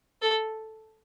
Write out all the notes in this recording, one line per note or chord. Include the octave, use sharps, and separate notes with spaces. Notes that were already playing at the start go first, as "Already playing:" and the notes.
A4